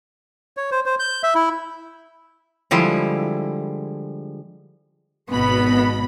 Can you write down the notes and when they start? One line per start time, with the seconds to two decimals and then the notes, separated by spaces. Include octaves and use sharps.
0.57 C#5
0.72 C5
0.86 C5
0.99 G6
1.23 E5
1.35 E4
2.71 D3 F3 G3 G#3 E4
5.31 G#1 B2 B3 B5